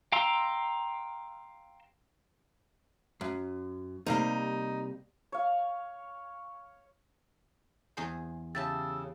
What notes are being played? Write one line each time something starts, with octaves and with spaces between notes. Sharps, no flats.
F5 G5 A#5 C6 E6
F#2
C3 G3 A#3 D#4
C#5 F5
E2 G#4 C5
C#3 G4 E5 A5 E6 A6